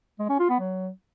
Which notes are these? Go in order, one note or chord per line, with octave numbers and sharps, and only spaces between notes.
G#3
C#4
F4
B3
F#3